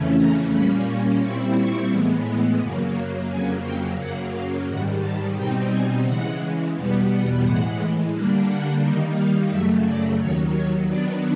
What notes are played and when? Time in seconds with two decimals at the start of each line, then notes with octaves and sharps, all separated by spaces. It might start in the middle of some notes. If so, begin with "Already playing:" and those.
Already playing: F2 C#3 E3 A3 C#4
0.18 A#5
0.52 A#2 G3 A#3 C#4 B5
0.87 C#6
1.21 A#2 G3 C4 E4 C#6
1.56 C#6
1.90 A2 E3 G#3 B3
2.61 F#2 C#3 F#3 A#3
3.28 F2 C#3 F#3 A#3 G#5
3.64 G5
3.98 F#2 C#3 F#3 A#3 F#5
4.32 F5
4.67 G#2 D#3 G3 F#5
5.02 A5
5.36 B2 G3 C4 D#4 G5
5.70 G#5
6.04 C#3 E3 G#3 F#5
6.74 E2 B2 G3 B3
7.09 F#5
7.42 A2 E3 G#3 F#5
8.13 D3 G3 A#3 D4
8.46 F#5
8.81 D#3 G3 A#3 D#4
9.15 F5
9.50 F#2 C#3 F#3 A3 E5
9.85 D5
10.19 D#2 D#3 F#3 C#5
10.53 C#5
10.88 D#3 F#3 B3 D4 D5